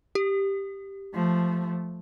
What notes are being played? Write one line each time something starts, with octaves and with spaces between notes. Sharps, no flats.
G4
F3 A3